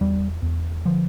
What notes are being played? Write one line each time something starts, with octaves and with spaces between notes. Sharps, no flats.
E2 G3
E2
D3 F3